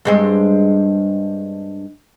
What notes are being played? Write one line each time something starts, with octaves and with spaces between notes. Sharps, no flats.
G2 G#3 C4